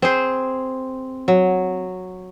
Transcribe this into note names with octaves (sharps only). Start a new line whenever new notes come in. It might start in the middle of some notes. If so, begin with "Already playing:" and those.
C4 G#4 C5
F#3